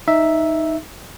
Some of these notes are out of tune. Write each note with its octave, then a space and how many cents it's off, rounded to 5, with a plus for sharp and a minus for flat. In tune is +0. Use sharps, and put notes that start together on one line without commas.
D#4 +0 E5 +0